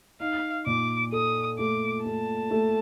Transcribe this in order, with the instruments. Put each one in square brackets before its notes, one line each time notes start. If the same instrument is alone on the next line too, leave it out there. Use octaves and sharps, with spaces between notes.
[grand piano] D#4 [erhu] F5
[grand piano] A#2 [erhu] D6
[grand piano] A4 [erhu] D#6
[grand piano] A3 [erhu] D6
[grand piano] A3 [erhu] A5
[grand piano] A3